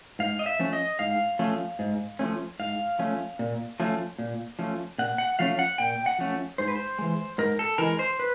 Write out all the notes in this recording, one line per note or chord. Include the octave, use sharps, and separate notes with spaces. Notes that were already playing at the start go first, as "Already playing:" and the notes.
G#2 F5
D#5
E5
F3 A3 C#4
D#5
G#2 F5
F3 A3 C#4
G#2
F3 A3 C#4
G#2 F5
F3 A3 C#4
A#2
F3 A3 C#4
A#2
F3 A3 C#4
A#2 F#5
F#5
F3 A3 C#4 F5
F#5
A#2 G5
F#5
F3 A3 C#4
G#2 C5
B4
C5
E3 G#3
G#2 A#4
A4
E3 G#3 A#4
C5
B4